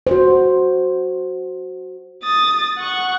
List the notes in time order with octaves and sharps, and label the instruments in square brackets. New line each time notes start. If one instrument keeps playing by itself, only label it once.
[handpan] F#4 C5
[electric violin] D#6 A6
F#5 C#6